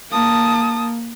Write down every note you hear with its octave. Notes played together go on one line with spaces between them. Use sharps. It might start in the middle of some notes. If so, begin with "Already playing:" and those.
A#3 A5 D#6